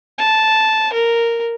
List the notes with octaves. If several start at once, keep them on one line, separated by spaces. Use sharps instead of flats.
A5
A#4